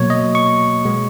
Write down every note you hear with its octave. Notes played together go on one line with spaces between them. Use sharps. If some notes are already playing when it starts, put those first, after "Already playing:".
Already playing: B2 F#3 A#3 C#5
D#5
C#6
B2 G#3 B3